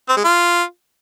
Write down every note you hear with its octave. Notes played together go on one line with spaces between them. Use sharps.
C4
G#3
F4